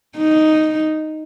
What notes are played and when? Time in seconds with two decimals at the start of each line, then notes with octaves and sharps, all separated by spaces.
0.17 D#4